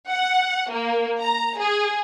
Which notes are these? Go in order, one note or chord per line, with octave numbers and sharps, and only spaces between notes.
F#5
A#3
A#5
G#4